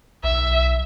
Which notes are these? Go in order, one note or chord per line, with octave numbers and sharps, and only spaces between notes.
B1 E5